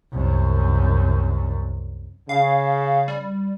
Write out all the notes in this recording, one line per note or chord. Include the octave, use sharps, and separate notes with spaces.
C2 F#2
C#3 F5
G3